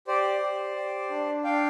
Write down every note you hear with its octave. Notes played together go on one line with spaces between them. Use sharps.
G4 C5 D5
G4
G4
D4
D4 F5 G5